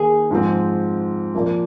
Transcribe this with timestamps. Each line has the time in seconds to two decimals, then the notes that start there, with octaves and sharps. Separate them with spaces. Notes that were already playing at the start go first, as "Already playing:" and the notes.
Already playing: D#3 A#3 D#4 G#4
0.31 G#2 F3 C4
1.35 A#2 F3 A#3